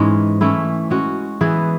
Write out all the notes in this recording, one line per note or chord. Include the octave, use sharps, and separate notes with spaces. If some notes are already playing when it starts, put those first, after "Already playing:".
Already playing: G#2 E3 G#3 C#4
E3 A3 C#4 E4
G#3 C#4 F#4
E3 B3 E4 G#4